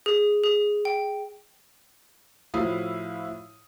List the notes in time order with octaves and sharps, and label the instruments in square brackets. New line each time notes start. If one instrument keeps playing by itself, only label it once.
[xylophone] G#4
G#4
G5
[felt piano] A2 F3 E4 F#4 F5 D#6